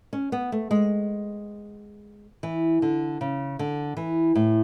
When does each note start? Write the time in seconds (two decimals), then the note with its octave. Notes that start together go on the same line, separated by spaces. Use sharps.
0.13 C#4
0.32 B3
0.52 A3
0.71 G#3
2.43 E3
2.82 D3
3.21 C#3
3.59 D3
3.97 E3
4.35 A2